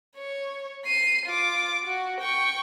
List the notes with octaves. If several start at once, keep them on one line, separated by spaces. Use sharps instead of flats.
C#5
C7 D#7
F4 D6
F#4
G5 C#6